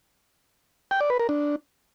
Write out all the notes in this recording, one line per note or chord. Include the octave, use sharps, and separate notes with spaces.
G5
D5
B4
A#4
D4